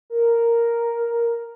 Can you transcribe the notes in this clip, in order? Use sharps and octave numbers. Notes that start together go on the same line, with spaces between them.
A#4